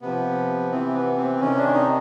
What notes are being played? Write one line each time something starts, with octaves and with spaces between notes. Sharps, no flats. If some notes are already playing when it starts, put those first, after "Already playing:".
C3 F3 B3
C3 E3 C4
B3
C4
C3 D#3 C#4
D4
D#4